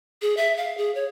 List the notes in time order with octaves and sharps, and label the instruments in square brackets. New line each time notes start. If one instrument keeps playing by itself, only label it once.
[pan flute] G#4
E5
F5
G#4
C#5